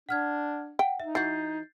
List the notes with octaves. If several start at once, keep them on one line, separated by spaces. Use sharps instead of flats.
D4 F#5 F6 G#6
F#5 G5
D#4 E5
E3 F#4 G6 A6 C7